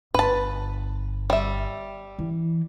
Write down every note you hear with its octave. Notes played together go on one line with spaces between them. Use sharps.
G1 B4 A5
G3 E5
E3